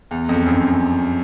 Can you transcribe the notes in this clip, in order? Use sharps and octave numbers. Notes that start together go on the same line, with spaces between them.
E2
F2
F#2